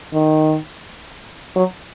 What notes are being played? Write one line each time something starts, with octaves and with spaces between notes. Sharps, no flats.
D#3
F#3